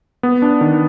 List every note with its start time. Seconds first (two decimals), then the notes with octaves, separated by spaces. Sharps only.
0.23 B3
0.42 D4
0.61 D#3